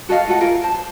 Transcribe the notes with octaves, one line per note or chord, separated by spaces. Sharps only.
F#4 A4 D#5 F5
F4 F#4 A4 F#5
F4 G#4 A#4 E5
C5 A5
C5